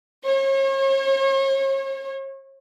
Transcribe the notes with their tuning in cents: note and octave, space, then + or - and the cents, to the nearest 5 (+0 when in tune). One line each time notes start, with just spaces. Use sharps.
C#5 -40